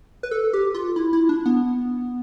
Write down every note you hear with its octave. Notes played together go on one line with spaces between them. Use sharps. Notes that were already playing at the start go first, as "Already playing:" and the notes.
B4
A4
G4
F4
E4
E4
D4
B3